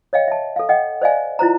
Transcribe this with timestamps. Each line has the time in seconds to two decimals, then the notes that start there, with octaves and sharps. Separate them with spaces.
0.13 C#5 D#5 F5 G5
0.28 E5 A5
0.56 A4 F5
0.69 D#5 F#5 G5
1.02 C5 D5 D#5 F5 G#5
1.39 E4 F4 C5 A#5